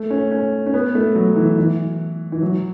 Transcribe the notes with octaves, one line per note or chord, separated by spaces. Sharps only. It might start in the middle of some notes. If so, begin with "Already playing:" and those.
Already playing: A3
C#4
C#4
C#4
B3
A3
F#3
E3
E3
E3
F#3